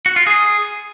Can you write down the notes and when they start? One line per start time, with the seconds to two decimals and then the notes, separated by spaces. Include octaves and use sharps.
0.06 F#4
0.16 F4
0.27 G#4